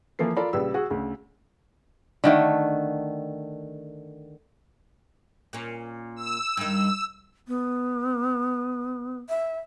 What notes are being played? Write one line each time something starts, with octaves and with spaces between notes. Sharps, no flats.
E3 F3 A#3 A4 C7
F4 A4 A#4 D5 B5
A#1 C#3 G3 B4 E6
F#4 G#4
D2 C#3
D3 D#3 A3
A#2 C#4
E6
G2 D#3 E6
B3
E5